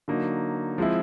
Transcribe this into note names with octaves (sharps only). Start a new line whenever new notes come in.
D3 F#3 A#3 D#4
F3 G#3 C4 E4